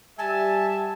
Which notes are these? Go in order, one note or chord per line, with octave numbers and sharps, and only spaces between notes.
G3 G4 E5 G#5 A5